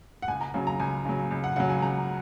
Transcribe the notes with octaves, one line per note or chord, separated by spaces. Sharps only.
F#5
C#2 G#5
A#5
C#3 F#3
A#5
C#2 G#5
C#3 F#3
C#2
F#5
C#3 F#3 F#5
G#5
C#2 A#5